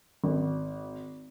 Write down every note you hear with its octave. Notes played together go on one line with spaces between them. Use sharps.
G#1